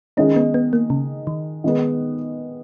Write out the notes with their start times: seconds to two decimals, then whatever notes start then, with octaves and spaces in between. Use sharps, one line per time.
0.17 D#3 G#3 C#4 D#4
0.36 B3
0.54 B3
0.73 A#3
0.90 C#3
1.27 D#3
1.64 D#3 G#3 B3